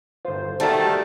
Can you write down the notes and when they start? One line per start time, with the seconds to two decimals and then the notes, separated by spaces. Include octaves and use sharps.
0.25 G1 F4 C5
0.60 D#3 G3 A3 F#4 A4 C5 A5